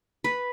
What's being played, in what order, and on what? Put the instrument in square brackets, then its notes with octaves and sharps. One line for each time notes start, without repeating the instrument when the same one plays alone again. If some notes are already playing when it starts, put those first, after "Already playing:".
[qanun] B4